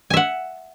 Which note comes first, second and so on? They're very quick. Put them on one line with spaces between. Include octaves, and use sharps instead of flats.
G#5 E5 F#5